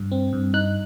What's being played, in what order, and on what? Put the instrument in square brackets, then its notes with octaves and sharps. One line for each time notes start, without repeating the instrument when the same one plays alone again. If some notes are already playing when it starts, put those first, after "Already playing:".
Already playing: [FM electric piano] G2
C4
G2
D#4 F#6